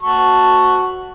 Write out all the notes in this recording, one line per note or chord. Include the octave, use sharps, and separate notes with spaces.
F#4 A5 C#6